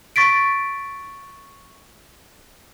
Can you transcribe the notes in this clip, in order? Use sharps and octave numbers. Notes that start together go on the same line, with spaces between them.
C#6 A6 B6 D7